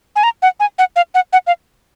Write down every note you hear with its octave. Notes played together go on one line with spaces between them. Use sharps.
G#5
A#5
F#5
G#5
F#5
F5
F#5
F#5
F5